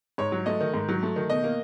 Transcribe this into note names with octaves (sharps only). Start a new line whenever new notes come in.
G#2 C#5
F#3
A3 D#5
D#3
G#2
F#3
A3
D#3
B2 D#5
A#3